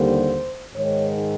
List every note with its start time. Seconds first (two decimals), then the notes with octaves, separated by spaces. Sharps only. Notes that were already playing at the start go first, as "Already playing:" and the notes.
Already playing: D#2 D3 G3 A#3 C5
0.73 G#2 D#3 G#3 C#5